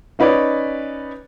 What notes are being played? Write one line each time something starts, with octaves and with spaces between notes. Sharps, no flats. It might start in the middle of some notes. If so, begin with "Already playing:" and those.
C#4 D#4 B4 C#5 D5